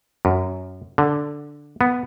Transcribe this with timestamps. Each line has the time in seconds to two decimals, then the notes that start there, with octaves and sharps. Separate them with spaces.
0.25 F#2
0.98 D3
1.81 B3